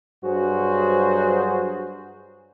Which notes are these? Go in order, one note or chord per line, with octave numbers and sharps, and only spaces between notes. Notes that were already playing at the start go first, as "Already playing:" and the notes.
G2 F#3 F#4 G#4 C5